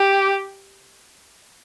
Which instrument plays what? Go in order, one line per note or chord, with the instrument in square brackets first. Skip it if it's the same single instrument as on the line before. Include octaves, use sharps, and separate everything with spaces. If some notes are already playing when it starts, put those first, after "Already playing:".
Already playing: [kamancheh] G4